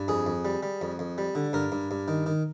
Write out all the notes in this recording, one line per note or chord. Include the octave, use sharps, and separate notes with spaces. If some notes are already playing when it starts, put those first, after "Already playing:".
Already playing: G2
F2 G#4
F2
G3
G3
F2
F2
G3
D3
G2 A#4
G2
G2
D#3
D#3